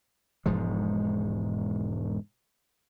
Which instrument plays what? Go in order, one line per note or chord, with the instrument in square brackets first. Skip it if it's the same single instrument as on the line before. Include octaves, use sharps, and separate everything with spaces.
[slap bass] E1 G#2 F3 G#3